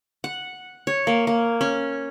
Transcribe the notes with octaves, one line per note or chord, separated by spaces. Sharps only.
F#5
C#5
A#3
A#3
C#4